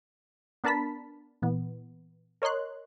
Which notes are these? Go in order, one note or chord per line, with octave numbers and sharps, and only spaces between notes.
B3 D4 A#4 A5 B5 B6
A#2 E3 B3
A#4 C#5 D#5 C6 F#6